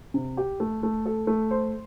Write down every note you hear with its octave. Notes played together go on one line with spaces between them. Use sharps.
C3
G4
A3
A3
A4
A3
C5